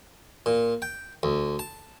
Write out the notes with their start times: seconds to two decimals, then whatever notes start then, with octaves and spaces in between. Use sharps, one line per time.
0.46 A#2
0.82 G5
1.23 D2
1.59 A5